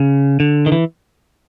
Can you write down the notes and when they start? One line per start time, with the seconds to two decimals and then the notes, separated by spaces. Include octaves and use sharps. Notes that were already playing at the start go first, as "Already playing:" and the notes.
Already playing: C#3
0.40 D3
0.66 D#3
0.72 E3